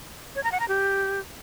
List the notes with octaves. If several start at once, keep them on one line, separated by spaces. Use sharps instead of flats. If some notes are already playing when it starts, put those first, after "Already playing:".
C#5
A#5
F#5
A#5
G4